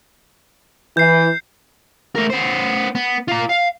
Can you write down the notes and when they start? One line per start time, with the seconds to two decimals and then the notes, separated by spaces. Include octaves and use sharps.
0.97 E3 G6 C7
2.16 A3 A#4
2.30 B3 C5
2.95 B3
3.28 F4 A#5
3.49 F5